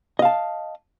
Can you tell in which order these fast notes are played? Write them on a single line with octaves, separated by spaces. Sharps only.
D#5 F5 A5